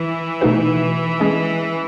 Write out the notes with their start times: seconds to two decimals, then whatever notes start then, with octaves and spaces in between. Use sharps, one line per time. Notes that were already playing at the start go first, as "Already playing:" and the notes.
Already playing: E3
0.41 B2 A3 D#4 F#4 B4
1.20 G#3 C#4 G#4 D#5